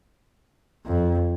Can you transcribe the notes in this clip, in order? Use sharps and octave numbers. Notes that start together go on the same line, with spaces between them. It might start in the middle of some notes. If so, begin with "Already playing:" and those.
F2